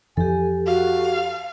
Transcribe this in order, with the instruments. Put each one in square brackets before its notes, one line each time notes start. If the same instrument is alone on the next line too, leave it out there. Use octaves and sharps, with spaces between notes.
[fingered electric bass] F2 E3 F3 [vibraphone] G4 A4 [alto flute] G#5
[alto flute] F#4 [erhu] F5